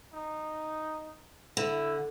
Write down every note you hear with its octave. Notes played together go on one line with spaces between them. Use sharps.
D#4
D3 E4